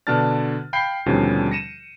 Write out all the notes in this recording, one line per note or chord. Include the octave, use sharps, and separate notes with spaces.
B2 D3 D4 A5 F6 A6
F5 G5 B5 G6 C7
D#2 B2 D3 F3 G3 C#4
A#6 C#7 D#7 E7